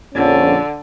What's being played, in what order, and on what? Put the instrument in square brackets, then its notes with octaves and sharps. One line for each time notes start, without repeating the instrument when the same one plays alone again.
[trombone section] A#1 F2 C#4 [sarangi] D3